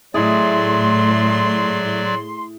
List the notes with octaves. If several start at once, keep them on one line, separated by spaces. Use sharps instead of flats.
A2 F#3 E4 G#4 D5 C6